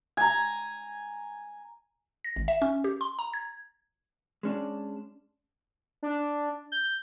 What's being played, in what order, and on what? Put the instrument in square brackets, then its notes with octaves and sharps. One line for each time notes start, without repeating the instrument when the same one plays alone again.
[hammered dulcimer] G#5 A#5
[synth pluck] A#6
G#1
E5
C#4
G4
C6
A#5
G#6
[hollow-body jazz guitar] G#3 C#4 D4
[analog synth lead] D4
G6